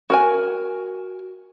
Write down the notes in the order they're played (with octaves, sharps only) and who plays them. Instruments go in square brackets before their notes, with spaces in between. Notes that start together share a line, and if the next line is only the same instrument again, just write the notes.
[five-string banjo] F#4 A#4 G#5